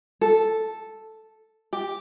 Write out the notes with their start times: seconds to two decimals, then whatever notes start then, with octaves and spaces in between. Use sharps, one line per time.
0.21 A4
1.73 G4